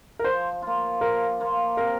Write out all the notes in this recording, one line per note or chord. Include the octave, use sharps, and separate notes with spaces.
A#4
F3 C5
A#3 F4
F3 A#4
A#3 F4
C3 A#4